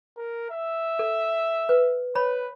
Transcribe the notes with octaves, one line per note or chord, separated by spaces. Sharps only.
A#4
E5
A4
B4
B4 C#5 B5